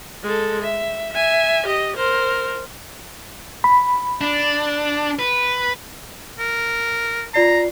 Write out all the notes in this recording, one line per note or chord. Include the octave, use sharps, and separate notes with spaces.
G#3 A4
E5
E5 G#5
G4 D#5
A#4 C5
B5
D4
B4
A#4
F4 D5 A#5 C7